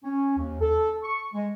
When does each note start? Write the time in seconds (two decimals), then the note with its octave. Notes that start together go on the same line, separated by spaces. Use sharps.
0.04 C#4
0.37 D#2
0.61 A4
1.03 C#6
1.34 G#3